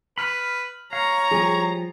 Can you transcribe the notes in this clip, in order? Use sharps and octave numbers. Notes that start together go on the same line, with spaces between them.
B4 B5 F6
C#5 F5 A#5
F3 G3 G#4